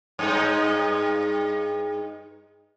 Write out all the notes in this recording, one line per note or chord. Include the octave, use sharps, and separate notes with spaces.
G2 G#3 D#4